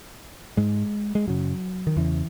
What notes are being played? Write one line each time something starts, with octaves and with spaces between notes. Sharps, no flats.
G#2 G#3
G#3
F#2 C#3 F#3
D#3
E2 C#3 E3